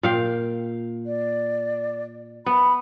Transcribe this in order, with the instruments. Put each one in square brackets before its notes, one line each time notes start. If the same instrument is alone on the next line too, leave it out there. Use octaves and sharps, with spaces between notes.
[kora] A#2 F5 G5
[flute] D5
[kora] B3 [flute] B5